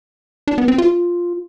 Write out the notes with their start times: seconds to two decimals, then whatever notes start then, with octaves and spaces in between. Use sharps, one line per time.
0.48 D4
0.58 B3
0.68 C4
0.78 F4